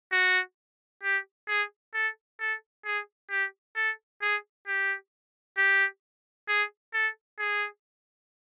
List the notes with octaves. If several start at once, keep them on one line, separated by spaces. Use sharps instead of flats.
F#4
G4
G#4
A4
A4
G#4
G4
A4
G#4
G4
G4
G#4
A4
G#4